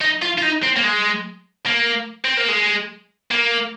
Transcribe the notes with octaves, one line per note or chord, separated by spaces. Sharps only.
D#4
F4
F4
D#4
C4
A#3
G#3
A#3
C4
A#3
G#3
A#3